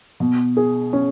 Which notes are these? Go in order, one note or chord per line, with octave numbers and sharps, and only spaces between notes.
B2
G#4
C#4